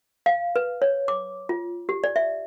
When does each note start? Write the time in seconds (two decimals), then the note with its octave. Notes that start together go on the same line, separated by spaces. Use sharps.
0.26 F5
0.56 B4
0.82 C#5
1.08 D6
1.49 F4
1.89 G4
2.04 D5
2.16 E5